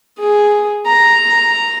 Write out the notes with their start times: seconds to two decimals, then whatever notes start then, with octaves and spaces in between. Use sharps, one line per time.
0.19 G#4
0.87 A#5